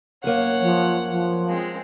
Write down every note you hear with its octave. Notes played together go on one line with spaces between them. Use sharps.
F#2 A#3 C#5 F#5
F3
F3
G#3 C4